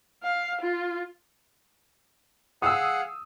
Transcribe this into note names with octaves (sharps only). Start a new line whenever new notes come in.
F5
F4
G#4 F5 F#5 D#6 E6